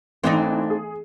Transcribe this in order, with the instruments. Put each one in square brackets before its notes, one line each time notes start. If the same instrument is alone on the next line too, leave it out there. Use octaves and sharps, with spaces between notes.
[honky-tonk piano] G#1 E3 [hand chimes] A3 A4 F5 [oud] C4 D4 D#4
[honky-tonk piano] G#4